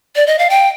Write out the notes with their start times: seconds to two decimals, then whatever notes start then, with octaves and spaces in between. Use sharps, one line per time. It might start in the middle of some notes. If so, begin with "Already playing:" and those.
0.16 D5
0.27 D#5
0.39 F5
0.50 G5